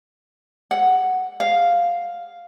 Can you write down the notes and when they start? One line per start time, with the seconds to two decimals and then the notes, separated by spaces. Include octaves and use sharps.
0.71 F#5
1.40 F5